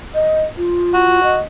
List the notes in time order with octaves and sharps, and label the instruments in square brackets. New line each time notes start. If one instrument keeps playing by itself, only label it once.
[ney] D#5
F4
[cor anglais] F#4
[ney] D#5